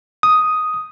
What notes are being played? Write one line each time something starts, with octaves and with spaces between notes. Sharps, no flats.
D#6